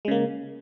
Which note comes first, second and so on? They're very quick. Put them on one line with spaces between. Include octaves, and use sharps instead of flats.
G#3 C#3 A#3